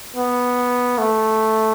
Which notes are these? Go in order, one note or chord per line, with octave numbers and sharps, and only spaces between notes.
B3
A3